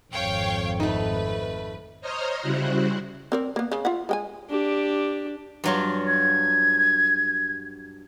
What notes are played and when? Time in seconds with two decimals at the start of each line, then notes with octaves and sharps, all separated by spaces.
0.13 G#1 F2 C#5 F5 G5
0.80 A3 D#4 B4
2.01 C5 C#5 D#5 A#5 D#6 F6
2.41 C#3 G3 E4 F#4 C5 F#5
3.32 C4 A#4 D5
3.56 A#3 B3
3.72 C#3
3.85 F4 E5 F#5
4.09 G#3 G5 G#5
4.50 D4 G4
5.64 G2 F#3 F4
6.07 G#6